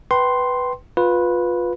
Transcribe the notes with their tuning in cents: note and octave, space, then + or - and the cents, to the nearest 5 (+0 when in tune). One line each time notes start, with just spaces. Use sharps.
B4 +0 G5 -25 C6 +0
F4 +20 B4 -5